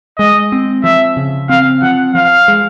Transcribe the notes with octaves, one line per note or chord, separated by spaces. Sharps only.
G#3 D#5
C4
F3 E5
C#3
C4 F5
F3 F#5
F3 F5
G#3